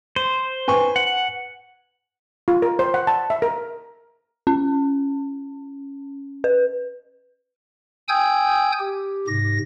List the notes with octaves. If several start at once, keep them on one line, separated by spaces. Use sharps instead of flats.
C5
B4 G#5 C#6
F#5
F4
A#4
C5
F#5
A5
E5
A#4
C#4
B4
G5 G#5 D#6 E6 G6 G#6
G4
G#2 C3 A#6